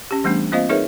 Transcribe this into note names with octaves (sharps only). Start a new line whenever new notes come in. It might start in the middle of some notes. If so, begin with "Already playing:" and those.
C#4 G4
E3 G3 A3 B3 D4
A#3 C4 F4 C5 D#5 F5
D#4 G#4 A#4 B4 C#5 E5